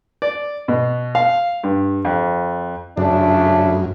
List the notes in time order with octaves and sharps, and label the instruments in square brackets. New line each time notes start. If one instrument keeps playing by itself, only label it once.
[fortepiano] D5
B2
F5
G2
F2
[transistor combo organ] F#2 [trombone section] C#3 A3 D4